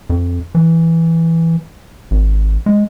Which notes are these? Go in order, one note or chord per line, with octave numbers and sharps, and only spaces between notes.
F2
E3
G#1
G#3